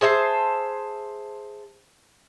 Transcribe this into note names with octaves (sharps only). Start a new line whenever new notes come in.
G#4 C5 E5 A5